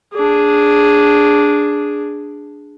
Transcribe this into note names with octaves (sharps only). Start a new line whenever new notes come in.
D4 G#4